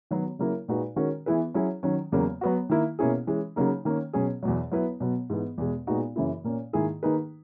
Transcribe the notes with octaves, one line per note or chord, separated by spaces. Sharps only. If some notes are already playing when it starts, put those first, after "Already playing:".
D#3 F#3 B3 F#4
C#3 F#3 A#3 E4 A#4
A#2 G#3 D#4 F#4 B4
D#3 G#3 C#4 F#4 A#4
E3 B3 E4 G#4 B4
F#3 C#4 E4 G#4
D#3 F#3 C#4
E2 C#3 F#3 A#3
F#3 B3 F#4
D#3 A#3 E4
B2 A#3 C#4 E4 G#4
E3 G#3 C#4
C#3 F#3 A#3 D#4
D#3 A#3 C#4
B2 F#3 C#4 G#4
E2 B2 F#3
F#3 B3 E4 B4
B2 F#3 B3
G#2 E3 B3
E2 B2 G#3
A#2 G#3 B3 D#4 F#4
F#2 C#3 E3 A#3 E4
A#2 A#3 C#4
G#2 D#3 A#3 E4 G#4
D#3 A#3 D#4 G#4 B4